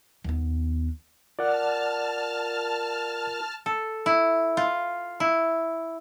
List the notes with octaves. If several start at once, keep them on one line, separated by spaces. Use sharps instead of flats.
D#2 B3
F4 A#4 D5 F#5 A5 F6
A4
E4
F4
E4